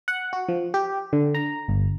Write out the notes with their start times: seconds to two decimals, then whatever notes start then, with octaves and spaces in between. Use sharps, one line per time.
0.08 F#5
0.33 F#4
0.49 F3
0.74 G4
1.13 D3
1.35 A#5
1.68 G1